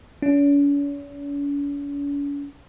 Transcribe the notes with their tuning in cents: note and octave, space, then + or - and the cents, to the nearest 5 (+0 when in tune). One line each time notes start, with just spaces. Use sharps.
C#4 +45